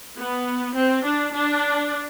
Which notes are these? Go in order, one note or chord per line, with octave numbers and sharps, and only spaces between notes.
B3
C4
D4
D4